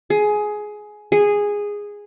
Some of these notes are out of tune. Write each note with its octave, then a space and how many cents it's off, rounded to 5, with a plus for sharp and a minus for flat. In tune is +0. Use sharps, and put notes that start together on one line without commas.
G#4 +15
G#4 -10